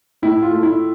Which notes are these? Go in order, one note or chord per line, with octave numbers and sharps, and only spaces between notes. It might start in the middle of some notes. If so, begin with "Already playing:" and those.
A2 E4
F4
A3
E4